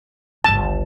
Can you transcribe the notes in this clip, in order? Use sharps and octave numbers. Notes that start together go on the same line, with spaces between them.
G1 C#2 A5